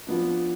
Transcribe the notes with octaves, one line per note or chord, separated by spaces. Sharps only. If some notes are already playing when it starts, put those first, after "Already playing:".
F3 B3 D4